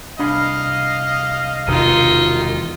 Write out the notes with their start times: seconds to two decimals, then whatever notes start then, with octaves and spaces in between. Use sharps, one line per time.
0.19 C2 D4 D#5 F5 B5
1.68 E1 C3 D#3 D#4 F4